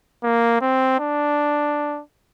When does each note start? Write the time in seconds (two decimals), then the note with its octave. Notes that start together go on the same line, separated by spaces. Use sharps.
0.23 A#3
0.61 C4
0.99 D4